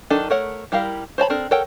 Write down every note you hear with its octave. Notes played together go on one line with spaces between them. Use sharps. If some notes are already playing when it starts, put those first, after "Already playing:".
D#3 F#3 D4 D#4 A4
A3 A4 A#4 C#5 F#5
G3 E4 G4 A#4 F5
C5 C#5 A5 B5
C4 D4 A4 A#4
A4 A#4 C#5 F#5 G5